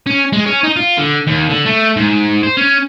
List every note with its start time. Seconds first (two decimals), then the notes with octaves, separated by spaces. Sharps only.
0.07 C#4
0.33 G#3
0.46 C#4
0.63 D#4
0.76 F4
0.98 D3
1.27 D#2
1.51 D3
1.66 A3
1.97 G#2
2.43 C5
2.57 C#4